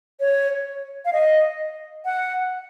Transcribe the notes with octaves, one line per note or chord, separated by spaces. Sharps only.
C#5
F5
D#5
F#5